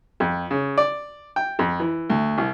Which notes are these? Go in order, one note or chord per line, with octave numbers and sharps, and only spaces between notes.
F2
C#3
D5
G5
F2
E3
D2
C2